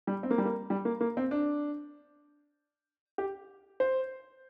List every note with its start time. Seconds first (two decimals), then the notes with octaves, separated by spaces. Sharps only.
0.07 G3
0.23 C4
0.31 A#3
0.38 G3
0.45 A#3
0.70 G3
0.85 A#3
1.01 A#3
1.17 C4
1.31 D4
3.18 G4
3.80 C5